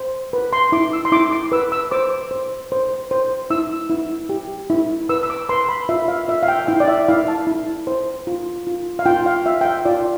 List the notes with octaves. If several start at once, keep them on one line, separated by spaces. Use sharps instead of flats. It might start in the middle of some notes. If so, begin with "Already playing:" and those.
Already playing: C5
B4
C6
E4 D6
E6
C6
E4 D6
D6
B4 E6
E6
C5 D6
C5
C5
C5
E4 E6
E4
G4
E4
B4 E6
E6
D6
B4 C6
B5
F4 E5
F5
F4 E5
F5
G5
E4 G5
D5
E5
E4 F5
A5
E4
C5
F4
F4
F5
F4 G5
F5
F4 E5
G5
F5
F4 D5